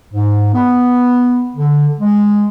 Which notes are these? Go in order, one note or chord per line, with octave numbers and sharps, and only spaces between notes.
G#2
B3
D3
G#3